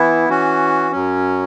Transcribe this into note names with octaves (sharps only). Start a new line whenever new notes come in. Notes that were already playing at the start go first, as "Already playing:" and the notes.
Already playing: E3 B3 E4
E3 C#4 F#4
F#2 F#3 C#4